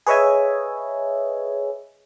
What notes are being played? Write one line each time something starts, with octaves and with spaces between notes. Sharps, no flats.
G#4 B4 C#5 D#5 E5 G#5